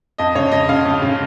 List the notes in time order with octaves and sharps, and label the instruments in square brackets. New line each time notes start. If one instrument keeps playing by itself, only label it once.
[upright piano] F2 D#5
C#3 C#5
F2 D#5
C#3 F5
F2
C#3